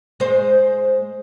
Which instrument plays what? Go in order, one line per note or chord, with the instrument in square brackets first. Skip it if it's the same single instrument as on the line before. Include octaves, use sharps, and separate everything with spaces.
[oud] G#3 C5